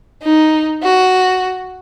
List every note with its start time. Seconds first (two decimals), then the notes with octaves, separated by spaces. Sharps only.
0.23 D#4
0.83 F#4